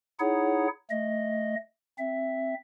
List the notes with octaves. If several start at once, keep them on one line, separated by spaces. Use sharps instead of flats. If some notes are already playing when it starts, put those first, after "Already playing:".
D#4 E4 G#4 C#5 F#5
A3 D#5
C4 E5